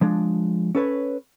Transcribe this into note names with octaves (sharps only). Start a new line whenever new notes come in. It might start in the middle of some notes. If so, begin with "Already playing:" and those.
F3 G#3 D4
C#4 A4 B4 C#5